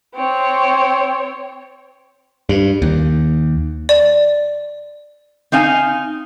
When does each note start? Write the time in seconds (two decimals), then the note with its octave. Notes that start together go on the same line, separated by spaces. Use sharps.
0.15 C4 C#5
2.49 G2
2.82 D#2
3.89 D5
5.52 C4 D#4 F5 G#5